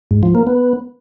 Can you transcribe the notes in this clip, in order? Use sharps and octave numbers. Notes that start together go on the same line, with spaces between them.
G#2
F3
A#3
B3